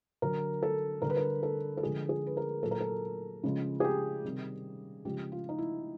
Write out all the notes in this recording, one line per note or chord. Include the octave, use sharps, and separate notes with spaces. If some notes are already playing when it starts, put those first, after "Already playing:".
D3 F#3 A#4
A4
D3 G3 A#4
B4
A#4
A4
A4
D3 F3 G#3 G#4
G#4
B4
A#4
A#2 F#3 A4
A#4
A4
C#3 F3 G#3
G#4
G4
C3 D#3 G3
C#3 F3 G#3 G4
F4
D#4
E4